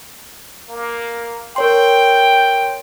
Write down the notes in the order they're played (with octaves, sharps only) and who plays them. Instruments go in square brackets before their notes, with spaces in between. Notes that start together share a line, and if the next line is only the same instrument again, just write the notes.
[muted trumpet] A#3
[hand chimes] A#4 C#5 C6 [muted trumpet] G5